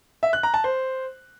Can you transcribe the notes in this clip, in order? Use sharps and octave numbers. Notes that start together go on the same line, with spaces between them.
E5
F#6
A#5
A5
C5